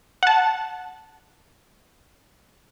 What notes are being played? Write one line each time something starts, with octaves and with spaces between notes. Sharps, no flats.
F#5 A5